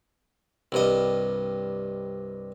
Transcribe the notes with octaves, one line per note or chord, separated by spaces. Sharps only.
C2 G2 D#5